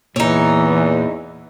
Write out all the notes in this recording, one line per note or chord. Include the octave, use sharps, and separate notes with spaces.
E2 A#2 E3 D#4 C#5